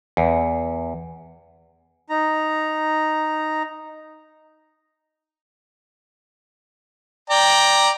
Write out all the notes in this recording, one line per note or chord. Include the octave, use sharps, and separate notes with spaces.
E2
D#4 A#5
D5 G5 A#5